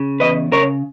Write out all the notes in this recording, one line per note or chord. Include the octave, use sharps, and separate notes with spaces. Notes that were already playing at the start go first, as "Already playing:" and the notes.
Already playing: C#3
E2 B4 D#5
C#3 A#4 C#5